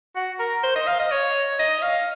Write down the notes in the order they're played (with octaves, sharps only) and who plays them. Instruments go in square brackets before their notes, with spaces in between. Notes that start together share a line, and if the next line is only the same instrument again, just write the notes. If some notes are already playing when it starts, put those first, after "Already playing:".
[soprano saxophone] F#4
A#4
C5
D#5
F5
D#5
C#5
D#5
D#5
F5